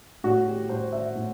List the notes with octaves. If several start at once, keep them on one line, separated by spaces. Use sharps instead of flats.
A2 F#4
G4
A2 C5
E5
A2